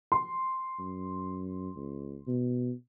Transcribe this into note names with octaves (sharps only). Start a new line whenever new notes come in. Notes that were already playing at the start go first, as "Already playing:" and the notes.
C6
F#2
C#2
B2